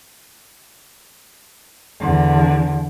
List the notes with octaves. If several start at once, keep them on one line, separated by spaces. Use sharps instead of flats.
E2 D3